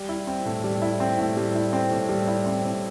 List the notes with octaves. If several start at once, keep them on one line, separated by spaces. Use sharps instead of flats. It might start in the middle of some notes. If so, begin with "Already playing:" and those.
Already playing: G3
E4
C4
A2
G3
E4
C4
A2
G3
E4
C4
A2
G3
E4
C4
A2